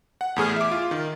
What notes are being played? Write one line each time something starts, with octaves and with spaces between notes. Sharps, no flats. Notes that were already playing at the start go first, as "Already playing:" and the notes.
F#5
E2 A2 G#4 F6
E5 D6
F4
D#3